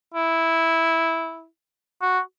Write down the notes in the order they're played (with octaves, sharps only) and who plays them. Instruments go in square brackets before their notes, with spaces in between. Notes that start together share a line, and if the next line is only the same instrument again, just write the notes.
[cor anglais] E4
F#4